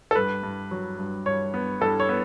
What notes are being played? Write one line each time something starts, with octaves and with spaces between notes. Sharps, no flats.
A4
G2 B4
G2
F#3
G2
G2 C#5
B3
G2 A4
C#5
B3